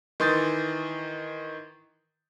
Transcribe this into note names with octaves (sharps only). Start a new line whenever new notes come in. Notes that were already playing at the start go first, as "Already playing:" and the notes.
D#3 E3 C6 D#6 G6 A6